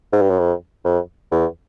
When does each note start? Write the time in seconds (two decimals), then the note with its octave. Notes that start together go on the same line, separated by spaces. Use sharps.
0.13 G#2
0.21 G2
0.30 F#2
0.39 F2
0.85 F2
1.31 E2